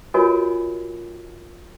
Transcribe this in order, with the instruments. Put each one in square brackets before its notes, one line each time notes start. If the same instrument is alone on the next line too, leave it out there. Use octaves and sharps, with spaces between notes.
[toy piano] F4 F#4 A#4 C#5 D#5 G#5